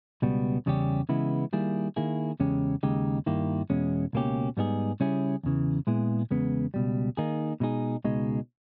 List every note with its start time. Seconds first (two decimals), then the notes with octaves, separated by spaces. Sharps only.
0.22 C#2 B2 G3 B3
0.66 E2 C#3 G3 C#4 G4
1.09 C#3 E3 G#3 B3 E4
1.53 D#3 G3 A#3 E4 G#4
1.96 D#3 A#3 E4 G#4
2.40 E2 C#3 G#3 C#4 G4
2.83 D#2 C#3 G#3 D#4 G4
3.26 G2 D#3 A#3 E4 G4
3.70 E2 B2 G#3 C#4
4.13 C#2 B2 A#3 C#4 G4
4.57 G#2 G3 B3 D#4 G#4
5.00 C#3 G3 C#4 E4 G#4
5.43 E2 C#3 E3
5.87 A#2 G#3 B3 E4 G#4
6.31 E2 C#3 G#3 B3
6.74 C#2 B2 G3
7.17 D#3 A#3 D#4 G#4
7.60 B2 G#3 D#4 G#4
8.04 C#2 B2 G#3 D#4